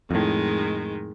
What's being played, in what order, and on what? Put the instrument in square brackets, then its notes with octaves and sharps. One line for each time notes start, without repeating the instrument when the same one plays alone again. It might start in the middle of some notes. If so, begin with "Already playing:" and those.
[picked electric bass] F2 A2 [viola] D#3 G#3